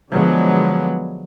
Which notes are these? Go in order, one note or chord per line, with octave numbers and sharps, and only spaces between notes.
D3 F3 F#3 G#3 B3